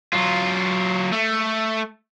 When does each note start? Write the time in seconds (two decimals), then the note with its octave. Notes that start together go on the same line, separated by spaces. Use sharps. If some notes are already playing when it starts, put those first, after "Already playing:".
0.13 F#3 F4
1.12 A3